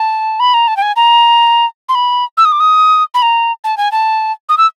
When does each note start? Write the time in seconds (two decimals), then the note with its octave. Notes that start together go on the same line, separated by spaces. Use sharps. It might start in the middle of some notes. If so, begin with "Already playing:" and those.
Already playing: A5
0.40 B5
0.54 A#5
0.68 A5
0.77 G5
0.82 G#5
0.96 A#5
1.89 C6
1.95 B5
2.37 E6
2.45 D#6
2.52 D6
2.60 D#6
3.14 B5
3.22 A#5
3.64 A5
3.77 G#5
3.92 A5
4.49 D#6
4.58 E6